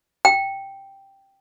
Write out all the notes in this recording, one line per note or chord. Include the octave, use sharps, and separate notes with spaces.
G5